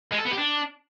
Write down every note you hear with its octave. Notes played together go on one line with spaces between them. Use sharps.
G#3
A4
B3
G4
D4